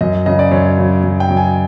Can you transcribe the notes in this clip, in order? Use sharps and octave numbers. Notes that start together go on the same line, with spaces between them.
F#2 D#5
C#3 F#3 D#5
D5
F#2 C#5
C#3 F#3
F#2
G5
C#3 F#3
G#5